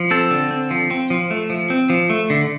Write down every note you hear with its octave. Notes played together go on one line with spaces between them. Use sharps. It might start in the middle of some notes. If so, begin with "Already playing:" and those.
Already playing: F3
C4 A4
D3
C4
F3
C4
F3
A3
F3
C4
F3
A3
D3